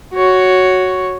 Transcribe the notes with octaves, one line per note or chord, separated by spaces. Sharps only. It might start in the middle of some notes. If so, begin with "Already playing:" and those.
F#4 C#5